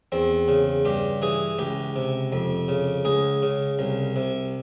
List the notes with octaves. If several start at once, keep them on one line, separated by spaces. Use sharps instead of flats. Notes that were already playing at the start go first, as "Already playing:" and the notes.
E2 C4
C#3
G2 G4
E3 G#4
C#2 G4
C3
F2
C#3
C#2 G#4
C#3
C2
C3